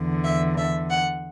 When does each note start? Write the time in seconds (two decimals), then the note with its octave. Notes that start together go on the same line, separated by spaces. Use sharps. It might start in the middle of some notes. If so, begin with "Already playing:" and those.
Already playing: E2 D3
0.25 E5
0.57 E5
0.91 F#5